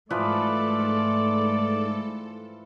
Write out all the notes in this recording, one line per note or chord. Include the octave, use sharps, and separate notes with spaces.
G#2 E3 F3 A3 A4 B4 D5